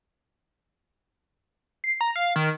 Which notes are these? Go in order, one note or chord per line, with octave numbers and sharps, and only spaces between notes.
C7
A#5
F5
D#3